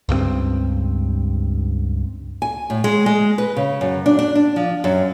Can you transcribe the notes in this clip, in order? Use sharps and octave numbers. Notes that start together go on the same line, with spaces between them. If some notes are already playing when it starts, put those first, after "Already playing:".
C#2 G2 F3 C4
G#5
A2
G#3
G#3
B4
C#3
F#2
D4
D4
D4
F3
F#2